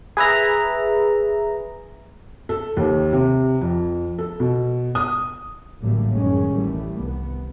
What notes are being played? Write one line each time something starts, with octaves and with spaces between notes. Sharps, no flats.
G#4 B4 E5 A#5
A4
D#2
C3
F2
A4
B2
D#6
A1 D3 F#3 G3 A3 A#3
F#2 D#3 G#3 C#4
A1 D#3 E3 G3 A3
C2 B3